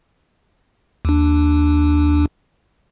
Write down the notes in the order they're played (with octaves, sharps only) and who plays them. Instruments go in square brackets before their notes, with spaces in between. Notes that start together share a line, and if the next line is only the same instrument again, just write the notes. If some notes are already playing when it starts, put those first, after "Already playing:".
[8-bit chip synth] D#2 D4